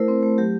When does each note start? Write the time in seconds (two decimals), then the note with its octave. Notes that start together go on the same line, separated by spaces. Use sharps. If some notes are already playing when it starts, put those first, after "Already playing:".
Already playing: A3 E4 A#4 C5
0.08 C4
0.23 A3
0.38 F#3 G4